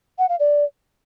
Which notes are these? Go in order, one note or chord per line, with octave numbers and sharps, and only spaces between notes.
F#5
F5
D5